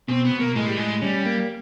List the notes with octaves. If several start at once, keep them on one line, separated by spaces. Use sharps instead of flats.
B2 C4
B3
B2
A#3
A2 G#3
G3
A2 G#3
G3 C#4
A#3